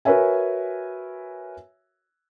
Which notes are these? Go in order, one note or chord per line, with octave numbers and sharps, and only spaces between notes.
F#4 A#4 B4 C#5 E5 G#5